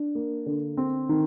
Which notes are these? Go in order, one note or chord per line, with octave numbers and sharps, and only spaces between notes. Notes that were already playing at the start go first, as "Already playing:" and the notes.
Already playing: D4
A#3
D3
C4
D#3